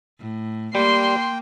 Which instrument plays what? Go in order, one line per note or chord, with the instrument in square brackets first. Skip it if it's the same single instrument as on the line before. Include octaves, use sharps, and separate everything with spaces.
[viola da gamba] A2
[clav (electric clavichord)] G3 [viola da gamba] A#3 [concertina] G5 [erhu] C6